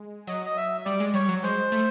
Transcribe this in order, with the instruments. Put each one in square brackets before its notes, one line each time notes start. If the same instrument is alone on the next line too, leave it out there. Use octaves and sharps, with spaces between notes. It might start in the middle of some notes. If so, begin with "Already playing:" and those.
Already playing: [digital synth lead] G#3
[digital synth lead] F#3 [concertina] D#5
[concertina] D#5
E5
[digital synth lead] G3 [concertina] D5
[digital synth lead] G#3
[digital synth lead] G3 [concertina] C#5
[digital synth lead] F#3
[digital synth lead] G#3 [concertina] C5
[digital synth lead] A3